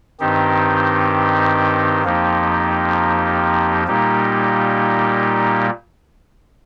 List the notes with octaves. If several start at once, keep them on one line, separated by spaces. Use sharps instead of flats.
G2 D#3 C4 D#4 G4
F2 F3 A#3 D#4 G4
A#2 G3 A#3 D#4 G4